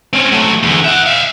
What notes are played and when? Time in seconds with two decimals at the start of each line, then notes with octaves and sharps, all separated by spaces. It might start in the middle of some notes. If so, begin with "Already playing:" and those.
0.13 C4 C#4
0.32 F#3 A3
0.63 E2 D3
0.84 E5 F#5
1.06 E5 F5